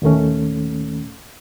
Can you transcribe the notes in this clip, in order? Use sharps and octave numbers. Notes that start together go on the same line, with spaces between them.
D#2 A#2 D#3 A3 C#4